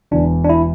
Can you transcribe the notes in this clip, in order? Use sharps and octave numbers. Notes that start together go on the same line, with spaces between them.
E1 E2 E3 D4
D4
E4